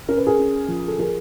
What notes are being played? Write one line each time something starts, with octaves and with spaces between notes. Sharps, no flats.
C#4 A#4
B4
G#4 A#4
C#4
F3
A4
F3 G#4 A#4